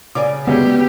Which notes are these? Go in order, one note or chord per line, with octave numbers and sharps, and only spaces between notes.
C#3 D5 G#5 D6
D2 G#3 B3 C#4 G4